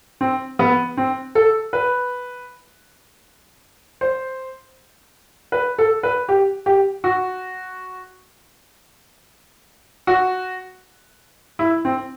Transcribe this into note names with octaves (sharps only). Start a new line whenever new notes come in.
C4
B3
C4
A4
B4
C5
B4
A4
B4
G4
G4
F#4
F#4
E4
C4